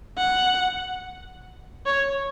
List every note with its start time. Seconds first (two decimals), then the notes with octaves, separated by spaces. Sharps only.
0.18 F#5
1.86 C#5